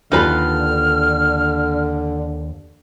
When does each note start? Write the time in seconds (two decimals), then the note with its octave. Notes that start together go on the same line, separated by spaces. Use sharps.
0.12 D#2 D3 D#4 F4 A4 B4 B5 F6